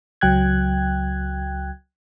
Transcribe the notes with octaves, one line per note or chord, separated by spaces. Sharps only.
C#2 F#3 G5 F#6 G#6